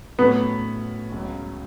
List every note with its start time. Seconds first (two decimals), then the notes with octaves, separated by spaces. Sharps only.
0.19 A2 F#3 A3 B3 C#4
1.12 C#2 C#3 F#3